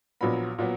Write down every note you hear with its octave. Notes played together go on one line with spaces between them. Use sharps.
A#1 A#2 F#3 B3 B5
A#2 F#3 B3